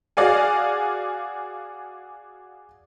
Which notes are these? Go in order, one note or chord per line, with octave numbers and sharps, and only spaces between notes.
F#4 G#4 D5 F5 G#5